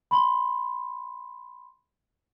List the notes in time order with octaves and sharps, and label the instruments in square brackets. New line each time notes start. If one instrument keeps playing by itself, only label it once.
[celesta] B5 C6